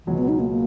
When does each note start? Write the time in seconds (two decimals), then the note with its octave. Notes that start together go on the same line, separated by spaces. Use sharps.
0.06 C#2 B2 E3 F#3
0.18 B3
0.29 D#4
0.39 A#3
0.50 A#3